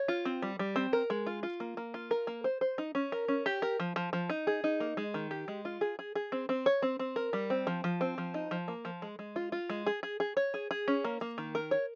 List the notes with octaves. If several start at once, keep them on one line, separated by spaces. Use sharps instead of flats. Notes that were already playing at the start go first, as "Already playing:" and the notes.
Already playing: C#5
F4
C4
G3
G3
C4
A#4
G#3
F4
F4
A#3
A#3
F4
A#4
A#3
C5
C5
D#4
C#4
A#4
C#4
G4
A#4
F3
F3
F3
D#4
G#4
D#4
A#3
G#3
D#3
G4
G#3
F4
G#4
G#4
G#4
C4
C4
C#5
C4
C4
A#4
G3
C4
F3
F3
C4
F3
D#4
F3
A#3
F3
G#3
G#3
F4
F4
G#3
G#4
G#4
G#4
C#5
G#4
G#4
C#4
A#3
A#3
D#3
A#4
C#5